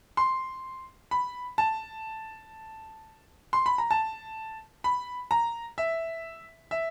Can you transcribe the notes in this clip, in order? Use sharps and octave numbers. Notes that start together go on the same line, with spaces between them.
C6
B5
A5
C6
B5
A#5
A5
B5
A#5
E5
E5